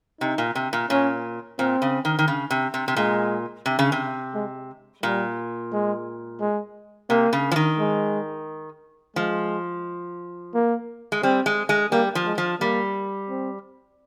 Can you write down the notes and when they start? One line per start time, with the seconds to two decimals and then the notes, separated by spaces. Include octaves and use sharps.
0.21 C3 D#4
0.38 A#2
0.55 C3
0.73 A#2
0.90 A#2 C#4
1.59 A#2 C4
1.82 C#3
2.05 D#3
2.19 D#3
2.28 C#3
2.50 C3
2.74 C3
2.88 C3
2.96 A#2 G#3
3.66 C3
3.79 C#3
3.92 C3
4.35 G#3
5.03 A#2 G3
5.72 G#3
6.41 G#3
7.10 C3 A#3
7.33 C#3
7.51 F3
7.56 D#3
7.79 G#3
9.16 F3 G#3
10.54 A#3
11.12 G#3
11.23 G3 C4
11.46 G#3
11.69 G#3
11.92 G3 A#3
12.15 F3
12.26 G#3
12.38 F3
12.60 G3 A#3
13.30 C4